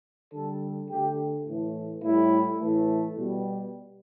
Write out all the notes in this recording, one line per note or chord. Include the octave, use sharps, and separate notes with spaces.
D3 G3 A4
D3 A3 G4
A2 E3 A3
A2 G3 E4
A2 E3 A3
B2 G3